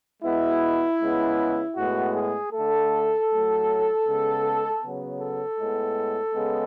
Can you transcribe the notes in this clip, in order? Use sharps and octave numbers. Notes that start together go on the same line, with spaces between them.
B2 G#3 B3 E4
C#3 G#3 B3
A2 G#3 B3 F#4
G#4
D3 A3 A4
A2 F#3 A3
C#3 G#3 B3
C#3 F#3 B3
A4
A2 G#3 B3
C#3 G#3 B3